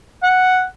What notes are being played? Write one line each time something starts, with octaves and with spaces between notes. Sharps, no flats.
F#5